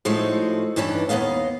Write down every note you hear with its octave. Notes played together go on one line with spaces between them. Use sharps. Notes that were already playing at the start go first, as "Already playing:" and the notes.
A2 F3 G#3 A3 D#4 F#4
G2 D#3 E3 C#4 D4
D#2 G#3 B3 D#5 F5